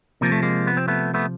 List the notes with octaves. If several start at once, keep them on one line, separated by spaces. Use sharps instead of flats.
C3 F3 A#3
A3
G#3 A#3
B3
C4
A3 B3
A3 B3